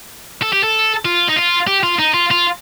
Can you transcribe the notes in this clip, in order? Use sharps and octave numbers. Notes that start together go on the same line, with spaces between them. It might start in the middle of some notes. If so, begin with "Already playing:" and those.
A4
G4
A4
F4
D#4
F4
G4
F4
D#4
F4
F4